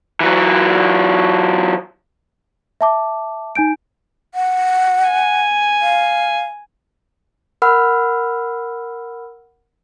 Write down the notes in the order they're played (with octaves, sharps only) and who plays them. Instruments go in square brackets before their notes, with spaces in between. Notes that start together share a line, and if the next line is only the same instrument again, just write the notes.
[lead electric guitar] E3 F#3
[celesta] E5 A5 D6
D#4 G#5 G6 D7
[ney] F#5
[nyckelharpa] G#5
[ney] F5
[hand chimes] A#4 F#5 B5 E6 F6